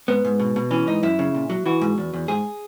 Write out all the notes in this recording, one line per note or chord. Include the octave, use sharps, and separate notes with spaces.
G#2 B3
G#2
B2
B2
E3 C#4
G#2 D#4
F#2 E4
C#3
A#2
F#3
E3 F#4
G#2
E2
E2
G#2 G#4